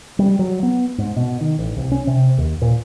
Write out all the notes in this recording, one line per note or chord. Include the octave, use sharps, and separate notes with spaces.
G3
F#3
B3
G#2
B2
D#3
A1
C2
C#4
C3
D#2
A#2